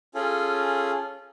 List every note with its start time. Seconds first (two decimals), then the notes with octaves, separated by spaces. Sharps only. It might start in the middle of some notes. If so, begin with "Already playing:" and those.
0.15 C#4 F4 G#4 A4